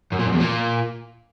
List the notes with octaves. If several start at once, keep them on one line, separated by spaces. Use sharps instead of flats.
F#2
A#2
F#2
E2
A#2